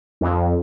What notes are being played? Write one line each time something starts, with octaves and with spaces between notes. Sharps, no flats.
F2